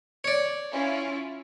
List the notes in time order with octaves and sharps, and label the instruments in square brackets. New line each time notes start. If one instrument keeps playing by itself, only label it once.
[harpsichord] C#5 D5
[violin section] C#4 E4 F4